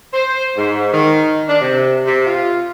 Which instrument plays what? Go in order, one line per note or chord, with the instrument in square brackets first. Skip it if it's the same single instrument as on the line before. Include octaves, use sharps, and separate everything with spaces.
[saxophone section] C5
G#2
D#3
D4
C3
C3
F4